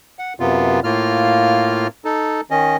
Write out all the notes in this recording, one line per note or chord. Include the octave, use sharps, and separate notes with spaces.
F#5
F#2 C3 B3 F4
A2 A#3 F4 F6
D#4 A4
D#3 C#4 D#5